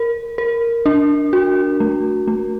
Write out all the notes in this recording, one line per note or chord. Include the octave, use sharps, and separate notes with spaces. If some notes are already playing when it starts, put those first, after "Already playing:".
Already playing: A#4
A#4
D4
F#4
A3
A3